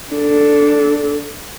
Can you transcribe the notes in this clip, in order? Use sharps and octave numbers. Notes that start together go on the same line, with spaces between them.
D4 A4